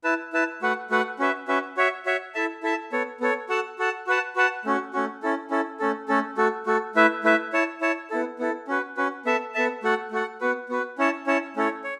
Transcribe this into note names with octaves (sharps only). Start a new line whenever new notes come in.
E4 B4 A5
E4 B4 A5
A3 F#4 B4 F#5
A3 F#4 B4 F#5
C#4 F#4 B4 E5
C#4 F#4 B4 E5
F#4 C#5 E5
F#4 C#5 E5
E4 A4 E5 A5
E4 A4 E5 A5
B3 A4 C#5
B3 A4 C#5
F#4 A4 F#5 A5
F#4 A4 F#5 A5
F#4 B4 F#5 A5
F#4 B4 F#5 A5
A3 C#4 F#4
A3 C#4 F#4
C#4 E4 A4
C#4 E4 A4
A3 C#4 A4
A3 C#4 A4
A3 F#4 A4
A3 F#4 A4
A3 E4 B4 E5
A3 E4 B4 E5
E4 C#5 A5
E4 C#5 A5
B3 E4 A4
B3 E4 A4
C#4 F#4 B4
C#4 F#4 B4
B3 A4 E5 A5
B3 A4 E5 A5
A3 F#4 A4 F#5
A3 F#4 A4 F#5
B3 F#4 B4
B3 F#4 B4
C#4 E4 C#5 A5
C#4 E4 C#5 A5
A3 C#4 E4 A4 C#5
C#5